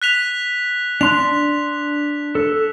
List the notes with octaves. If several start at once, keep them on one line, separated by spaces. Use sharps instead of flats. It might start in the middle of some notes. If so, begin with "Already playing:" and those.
F#6 B6 F7
D4 C6 F#6 F7
A4